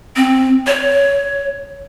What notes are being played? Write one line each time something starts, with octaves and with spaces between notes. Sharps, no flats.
C4
C#5